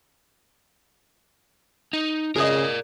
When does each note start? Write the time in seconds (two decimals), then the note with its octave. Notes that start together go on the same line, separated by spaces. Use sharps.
1.93 D#4
2.36 C#3 G#4 A#4 D5 D#5